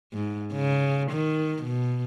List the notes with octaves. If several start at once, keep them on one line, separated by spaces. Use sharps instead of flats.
G#2
C#3
D#3
B2